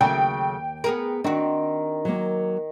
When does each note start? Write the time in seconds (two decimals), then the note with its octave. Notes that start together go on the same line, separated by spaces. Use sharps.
0.01 D#2 C#3 F#3 A3 G5
0.84 B3 G#4 A#4
1.24 D#3 C4 D4 F#4
2.05 F#3 A#3